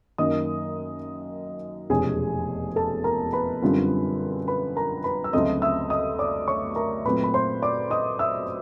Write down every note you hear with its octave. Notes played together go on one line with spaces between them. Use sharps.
F#2 D#3 F#3 A#3 D#4 D#5 D#6
F1 E2 B2 G#3 C#4 G#4 G#5
A4 A5
A#4 A#5
B4 B5
F#2 D3 G3 C4 F4
B4 B5
A#4 A#5
B4 B5
E6
D2 C#3 F#3 A3 C4 D#5 D#6
E5 E6
D#5 D#6
D5 D6
C#5 C#6
A#4 A#5
A#2 F#3 A3 C4 B4 B5
B5
C5 C6
D5 D6
D#5 D#6
E5 E6